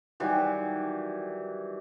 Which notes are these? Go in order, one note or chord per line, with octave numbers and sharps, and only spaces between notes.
D#3 E3 F#3 G3